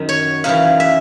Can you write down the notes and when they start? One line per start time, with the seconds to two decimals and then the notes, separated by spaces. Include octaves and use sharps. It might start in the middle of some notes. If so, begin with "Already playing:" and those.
Already playing: F#2 D#3
0.09 C#5
0.44 F#2 C#3 E3 F5
0.80 E5